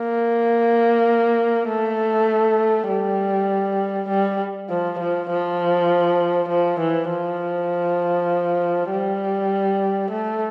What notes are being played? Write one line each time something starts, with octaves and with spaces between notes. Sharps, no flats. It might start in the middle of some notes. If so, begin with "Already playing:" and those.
Already playing: A#3
A3
G3
G3
F3
F3
F3
F3
E3
F3
G3
A3